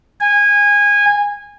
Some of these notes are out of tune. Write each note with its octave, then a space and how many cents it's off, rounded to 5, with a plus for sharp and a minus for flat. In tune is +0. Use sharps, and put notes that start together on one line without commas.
G#5 -20